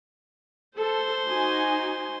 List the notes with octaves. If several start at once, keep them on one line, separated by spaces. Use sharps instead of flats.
A4 C5 C6
D#4 F#4 G#5